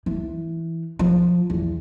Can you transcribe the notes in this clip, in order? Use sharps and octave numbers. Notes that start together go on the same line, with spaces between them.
E3
F3
E2